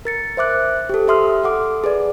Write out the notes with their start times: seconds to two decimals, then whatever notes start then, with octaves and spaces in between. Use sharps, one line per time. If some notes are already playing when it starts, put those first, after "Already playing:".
0.05 A#4 A6 C#7
0.37 C5 E5 D6 F#6
0.89 G4 A4
1.08 G4 E5 C6 D#6 F6
1.44 A4 F#5 D6
1.84 G#4 B4 D5